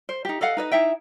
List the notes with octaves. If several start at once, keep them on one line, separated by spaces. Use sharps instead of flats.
C5
D#4 G4
A4 D#5 F5 F#5
D#4 B4 D#5
D#4 E4 E5 G5